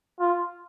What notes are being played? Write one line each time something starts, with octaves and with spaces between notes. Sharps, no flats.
F4